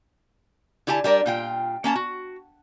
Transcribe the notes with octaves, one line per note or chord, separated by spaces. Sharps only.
D3 E4 G4 G#5 A5
G3 D4 A#4 D5
A#2 F4 G5
A#3 C#4 A5 A#5
F#4